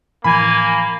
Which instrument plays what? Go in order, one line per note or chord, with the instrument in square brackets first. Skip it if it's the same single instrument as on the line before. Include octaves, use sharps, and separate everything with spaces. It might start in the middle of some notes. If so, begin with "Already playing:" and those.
[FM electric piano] A2 E3 F3 [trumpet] A#3 [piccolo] G#5 [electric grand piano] B5